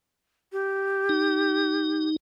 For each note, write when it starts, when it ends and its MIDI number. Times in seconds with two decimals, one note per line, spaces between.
0.52 2.07 67
1.09 2.16 63